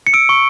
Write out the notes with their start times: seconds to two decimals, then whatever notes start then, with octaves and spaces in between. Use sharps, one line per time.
0.07 C#7
0.14 E6 D7
0.29 C#6